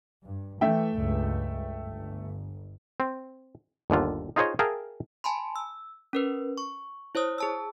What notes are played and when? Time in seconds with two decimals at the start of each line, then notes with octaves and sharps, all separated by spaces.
0.23 G2
0.61 E3 A3 E5 G5
0.96 C#2 G2
1.82 G1
3.00 C4
3.90 G1 D#2 D3 F4
4.36 D#4 F4 G#4 C5 C#5 D#5
4.59 G#4 A#4 E5 F5 G5 A5
5.24 G#5 A5 B5 C6
5.56 E6
6.13 C#4 A#4 B4
6.58 C#6
7.15 E4 C5 C#5 D#6
7.38 G#4 A5 E6